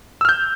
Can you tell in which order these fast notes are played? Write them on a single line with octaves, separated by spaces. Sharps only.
E6 F6 G6